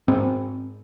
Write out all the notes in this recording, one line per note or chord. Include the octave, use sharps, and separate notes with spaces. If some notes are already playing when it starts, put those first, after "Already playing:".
G#2 C4